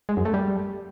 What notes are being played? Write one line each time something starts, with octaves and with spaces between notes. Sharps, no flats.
G#3
F#2
A3
G3